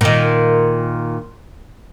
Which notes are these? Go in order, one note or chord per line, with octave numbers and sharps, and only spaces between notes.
A#2 D#3